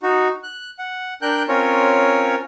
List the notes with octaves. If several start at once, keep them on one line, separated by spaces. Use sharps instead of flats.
D#4 F#4
F#6
F#5
D4 A#4 G5 F#6 G6
C4 C#4 F4 A#4 C#5